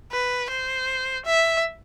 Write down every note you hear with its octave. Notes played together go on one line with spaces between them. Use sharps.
B4
C5
E5